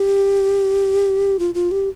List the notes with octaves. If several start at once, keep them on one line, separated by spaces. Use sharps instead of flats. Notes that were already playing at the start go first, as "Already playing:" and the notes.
Already playing: G4
F4
F4
G4